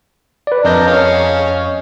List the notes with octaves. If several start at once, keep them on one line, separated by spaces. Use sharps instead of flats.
B4 D5
F2 D4 A#4 D5 D#5 G6
C#4 F5 C#6